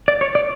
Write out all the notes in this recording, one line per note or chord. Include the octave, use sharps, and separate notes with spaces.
D5
C#5
D5